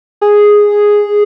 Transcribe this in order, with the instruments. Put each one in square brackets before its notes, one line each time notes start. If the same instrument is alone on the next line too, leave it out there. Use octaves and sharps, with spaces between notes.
[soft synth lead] G#4